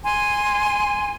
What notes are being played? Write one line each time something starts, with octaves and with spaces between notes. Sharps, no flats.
G#5 C6